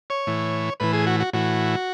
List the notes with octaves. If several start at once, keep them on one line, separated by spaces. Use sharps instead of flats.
C#5
A2 E3
A2 E3 B4
G#4
F#4
F#4
A2 E3 F#4